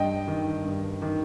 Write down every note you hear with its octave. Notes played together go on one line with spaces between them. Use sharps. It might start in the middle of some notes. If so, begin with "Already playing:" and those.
Already playing: G2 D#5 G5
D#3
G2
D#3